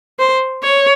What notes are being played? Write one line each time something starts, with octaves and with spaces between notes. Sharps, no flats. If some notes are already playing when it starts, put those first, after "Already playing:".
C5
C#5